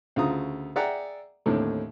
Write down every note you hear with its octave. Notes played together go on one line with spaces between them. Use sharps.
D2 C#3 F4 A#5 D#6
G#4 D5 E5 F#5 G5 A#5
D#2 A2 D3 C4